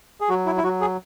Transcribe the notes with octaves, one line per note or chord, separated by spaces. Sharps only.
G#4
F#3 F#4
E4
E4
F#3 F#4
G#4